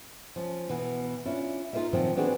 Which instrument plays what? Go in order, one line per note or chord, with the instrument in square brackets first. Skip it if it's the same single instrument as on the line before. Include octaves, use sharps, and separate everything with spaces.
[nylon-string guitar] F3 C#4
B2 E3
C#4 D4 E4 F4
D#4 F4 G#4 A#4 D#5 E5
A#2 D#3 F3 F#3 C4
E3 B3 C4 D4 F#4 G#4